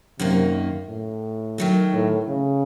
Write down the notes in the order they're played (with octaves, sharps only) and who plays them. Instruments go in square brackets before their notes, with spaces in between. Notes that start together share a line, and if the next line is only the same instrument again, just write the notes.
[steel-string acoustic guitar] F#2 D#3 A#3 [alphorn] C3
[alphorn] A2
[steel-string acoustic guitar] D#3 F#3 A3
[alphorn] A2
C#3